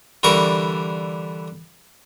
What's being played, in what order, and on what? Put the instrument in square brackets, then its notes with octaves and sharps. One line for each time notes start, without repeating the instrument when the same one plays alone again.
[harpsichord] D3 E3 G3 A#4 C#6